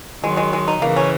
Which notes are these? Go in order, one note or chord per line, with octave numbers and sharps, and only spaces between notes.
D#3 F#3 G#3
G#3
G#3
D#4
C#3 E3 A#3
C#4